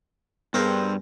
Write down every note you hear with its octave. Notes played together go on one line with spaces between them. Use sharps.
G2 B3 C4 G#4 A#4 C5